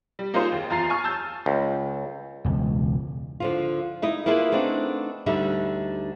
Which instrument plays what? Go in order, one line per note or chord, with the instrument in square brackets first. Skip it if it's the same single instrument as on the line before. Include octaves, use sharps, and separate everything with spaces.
[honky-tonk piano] G3
A#3 D#4 F4 G#4 C5
D#2
E2 F4 A#5 A6 C7
G#5 C#6 F6
A5 E6 G6 A6
[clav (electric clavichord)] C#2
[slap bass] E1 C#2
[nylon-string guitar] D3 F3 F4
D#4 E4 D#5
A#3 B3 E4 F4 G#4 B4
A3 B3 C4 D4 D#4
D2 D3 G3 D#4 E5